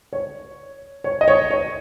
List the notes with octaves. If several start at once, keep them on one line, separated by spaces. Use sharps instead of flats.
C#5
C#5
D#5
C#5
C#5